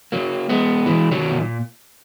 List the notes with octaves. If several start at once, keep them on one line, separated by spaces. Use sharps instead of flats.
F#3 A#3
G#3 B3
E3 G#3
D#3 F#3
B2
A#2